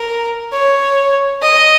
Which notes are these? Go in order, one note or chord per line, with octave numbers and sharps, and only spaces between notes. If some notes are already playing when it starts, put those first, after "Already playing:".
Already playing: A#4
C#5
D#5